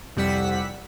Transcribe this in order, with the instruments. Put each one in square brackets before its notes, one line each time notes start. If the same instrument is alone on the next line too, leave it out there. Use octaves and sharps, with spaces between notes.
[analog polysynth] C2 F2 G3 F#5 E6 B6